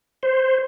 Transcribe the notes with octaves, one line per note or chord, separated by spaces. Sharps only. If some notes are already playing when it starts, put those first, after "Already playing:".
C5